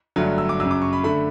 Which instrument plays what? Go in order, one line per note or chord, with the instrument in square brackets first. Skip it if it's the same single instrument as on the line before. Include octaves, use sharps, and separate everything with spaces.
[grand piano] G1 G2 F#3 A3
E6
D6
F#2 C#3 F#3 E6
D6
C#6
B5
D3 A3 B5